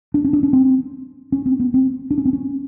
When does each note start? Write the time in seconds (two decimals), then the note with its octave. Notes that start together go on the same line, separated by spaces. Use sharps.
0.14 D4
0.24 C#4
0.33 D4
0.43 C#4
0.53 C4
1.32 C#4
1.46 C4
1.60 B3
1.74 C4
2.11 D4
2.18 C#4
2.25 C4
2.33 C#4